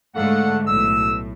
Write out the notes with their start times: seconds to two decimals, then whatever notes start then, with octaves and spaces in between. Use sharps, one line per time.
0.15 G#2 D3 A3 A4 F5 F#5
0.66 B1 A2 E6